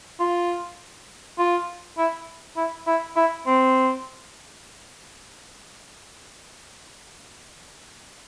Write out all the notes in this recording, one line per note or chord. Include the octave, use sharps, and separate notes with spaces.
F4
F4
E4
E4
E4
E4
C4